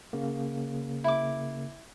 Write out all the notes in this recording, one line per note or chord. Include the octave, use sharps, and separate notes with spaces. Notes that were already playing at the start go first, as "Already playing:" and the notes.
C#3 A#3
E4 D6